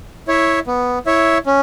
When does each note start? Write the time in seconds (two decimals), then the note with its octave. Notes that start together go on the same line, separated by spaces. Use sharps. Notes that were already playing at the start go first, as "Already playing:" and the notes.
0.28 E4 C#5 E5
0.67 B3
1.06 E4 C#5 E5
1.46 C#4